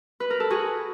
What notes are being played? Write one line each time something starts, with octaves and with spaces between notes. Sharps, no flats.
B4
A#4
A4
F#4 G#4